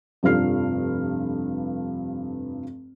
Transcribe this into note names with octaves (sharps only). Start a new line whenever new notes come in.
F1 G2 F3 A4 F6 C7